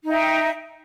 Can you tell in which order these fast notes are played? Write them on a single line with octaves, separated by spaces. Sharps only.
D#4 E5 G5